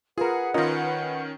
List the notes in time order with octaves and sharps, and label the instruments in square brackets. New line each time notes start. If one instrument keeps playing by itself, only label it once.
[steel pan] F4 A#4 [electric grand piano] G#4 [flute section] B4 F#5
[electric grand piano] D#3 C#4 [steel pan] F4 A#4 D#5